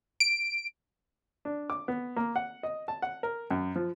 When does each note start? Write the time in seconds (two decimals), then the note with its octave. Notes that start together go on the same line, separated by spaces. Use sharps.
0.20 D7
1.45 D4
1.70 D6
1.88 B3
2.16 A#3
2.36 F#5
2.63 D#5
2.88 A5
3.02 F#5
3.23 A#4
3.51 F#2
3.76 F3